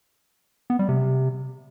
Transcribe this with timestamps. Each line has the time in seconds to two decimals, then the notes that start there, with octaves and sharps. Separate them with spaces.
0.70 B3
0.79 G3
0.89 C3